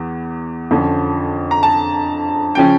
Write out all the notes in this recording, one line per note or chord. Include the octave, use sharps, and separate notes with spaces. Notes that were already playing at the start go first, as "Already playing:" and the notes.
Already playing: E2 E3
F2 D3 F3 C#4
A#5
A5
C#3 F3 C#4 G5